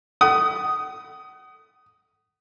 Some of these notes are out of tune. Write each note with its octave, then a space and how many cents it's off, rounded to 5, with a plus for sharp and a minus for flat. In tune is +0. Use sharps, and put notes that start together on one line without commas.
F#5 +40 D#6 +0